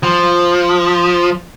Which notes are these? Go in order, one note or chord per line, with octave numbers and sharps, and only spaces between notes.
F3